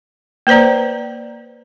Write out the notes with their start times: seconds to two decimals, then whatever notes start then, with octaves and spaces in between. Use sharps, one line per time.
0.47 A#3 B4 C5 D5 A#5